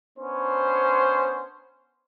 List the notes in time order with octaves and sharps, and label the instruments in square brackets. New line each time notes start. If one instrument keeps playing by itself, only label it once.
[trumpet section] B3 C#4 D4 C5